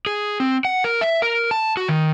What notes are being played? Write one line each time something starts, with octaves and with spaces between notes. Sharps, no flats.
G#4
C4
F#5
A#4
E5
A#4
A5
F#4
D#3